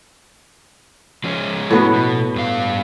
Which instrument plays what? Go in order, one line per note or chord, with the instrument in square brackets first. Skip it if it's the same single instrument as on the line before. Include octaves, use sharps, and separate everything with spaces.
[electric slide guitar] F3 G#3 C#4
[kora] A2 B3 F#4
[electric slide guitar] B2
G2 F5